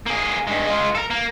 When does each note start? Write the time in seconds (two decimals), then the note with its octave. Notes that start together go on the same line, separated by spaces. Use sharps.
0.06 A#3 G#4
0.47 G2 G#3
0.67 G#3 F4
0.95 A4 A#4
1.10 A#3